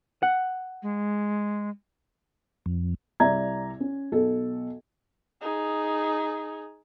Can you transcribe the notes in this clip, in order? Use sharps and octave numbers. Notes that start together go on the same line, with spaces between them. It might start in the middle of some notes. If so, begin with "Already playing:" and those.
F#5
G#3
F2
C2 D5 E5 A#5 G#6
C#4
B1 A4
D#4 G#4